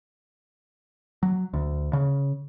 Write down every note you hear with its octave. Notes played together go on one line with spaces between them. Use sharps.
F#3
D2
C#3